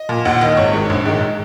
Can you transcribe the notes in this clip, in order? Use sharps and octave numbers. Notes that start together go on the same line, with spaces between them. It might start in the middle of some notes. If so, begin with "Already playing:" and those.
Already playing: D#5
A#2
D#2 F#5
D#3 D#5
G#1 C#5
G#2 D#3
A#1
G#2 D#3